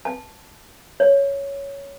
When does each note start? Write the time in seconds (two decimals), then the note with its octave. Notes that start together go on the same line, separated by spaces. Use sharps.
0.05 A5
1.00 C#5